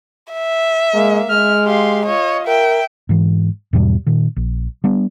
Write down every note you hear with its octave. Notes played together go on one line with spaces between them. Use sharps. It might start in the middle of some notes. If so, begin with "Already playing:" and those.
E5
G#3 A#3
G#3 F6
G4 F5 C6
F4 C#5 D#5
A#4 E5 G5
G#2 E3
E2 G#2 B2 G3
A#2 D#3
A#1
G3 B3 D4